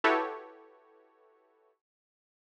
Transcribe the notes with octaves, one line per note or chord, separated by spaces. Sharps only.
E4 F#4 G4 A4 B4 C#5